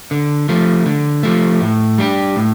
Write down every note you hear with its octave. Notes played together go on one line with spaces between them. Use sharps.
D3
F3 A3
D3
F3 A3
A2
G3 D4 G4
A2